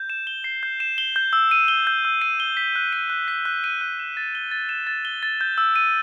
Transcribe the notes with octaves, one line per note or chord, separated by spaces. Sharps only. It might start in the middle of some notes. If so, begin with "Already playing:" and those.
Already playing: G6
E7
G7
C7
G6
E7
G7
G6
E6
D#7
G7
G6
E6
D#7
G7
B6
F#6
D#7
F#6
B6
F#6
D#7
F#6
E7
A6
G7
A6
E7
A6
G7
A6
G6
E6
D#7